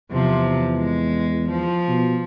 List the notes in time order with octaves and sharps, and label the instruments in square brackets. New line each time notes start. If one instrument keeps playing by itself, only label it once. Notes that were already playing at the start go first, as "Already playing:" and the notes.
[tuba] E2 [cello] C3 F3
[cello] G#3
F3
[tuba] B2